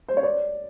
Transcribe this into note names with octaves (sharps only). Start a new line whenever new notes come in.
C5
C#5
D5